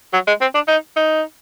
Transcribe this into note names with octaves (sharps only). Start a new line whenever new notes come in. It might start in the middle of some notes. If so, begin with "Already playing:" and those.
F#3
G#3
C4
D4
D#4
D#4